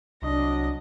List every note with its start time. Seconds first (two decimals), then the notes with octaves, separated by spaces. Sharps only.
0.23 C2 F#3 D4 D#5